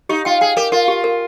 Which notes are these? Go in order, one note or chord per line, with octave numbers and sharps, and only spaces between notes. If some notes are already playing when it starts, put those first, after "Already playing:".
D#4 G4
F4 G5
G#4 G5
G4 A#4
F4 A#4
G4
A#4